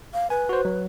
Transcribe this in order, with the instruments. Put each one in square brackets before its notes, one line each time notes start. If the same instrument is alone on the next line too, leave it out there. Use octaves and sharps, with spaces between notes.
[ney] F5
[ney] B4 [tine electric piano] G#5
[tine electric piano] F#4 C5
F#3